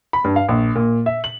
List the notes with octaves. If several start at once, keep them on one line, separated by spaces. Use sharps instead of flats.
B5
G2
F5
A#1
A#2
E5
F#7